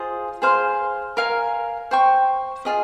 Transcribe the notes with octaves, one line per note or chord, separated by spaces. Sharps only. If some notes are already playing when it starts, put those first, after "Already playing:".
Already playing: F4 G#4 C5 D#5
G#4 C5 F5 C6
A#4 F5 G#5
C5 G5 C#6
F4 G#4 D#5